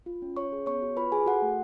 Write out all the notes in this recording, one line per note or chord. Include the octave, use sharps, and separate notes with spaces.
F4
C#4
C#4 C#5 C#6
G#4
B3 C#5 C#6
F#4
F4 B4 B5
G#4 G#5
F#4 A4 F#5
A3